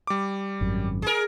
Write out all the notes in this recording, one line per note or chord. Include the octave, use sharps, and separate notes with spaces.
G3 D6
G#1 F#2
G#4 A#4